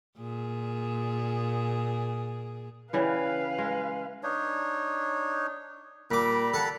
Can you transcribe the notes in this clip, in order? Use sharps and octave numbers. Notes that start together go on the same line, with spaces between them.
A#2 G#4
C#3 E3 G3 B4 F5
G#3
D4 D#4 C#5
A#2 G3 A#5 B5 D6
A4 F#5